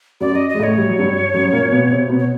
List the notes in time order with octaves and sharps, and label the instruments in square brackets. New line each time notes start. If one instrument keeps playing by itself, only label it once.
[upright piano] F#2 F#3 [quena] D5
[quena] D#5
[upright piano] G#3 [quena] D#5
[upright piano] A2 A3 [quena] C#5
[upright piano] G3
F#3
G2 G3
F#2 F#3
A#2 A#3
B2 B3
C3 C4
B2 B3
[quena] C#5